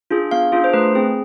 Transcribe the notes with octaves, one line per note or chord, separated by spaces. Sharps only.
D4 F4 G#4
B3 F5
D4 F4 G#4
C5
A3 B4
C4 G#4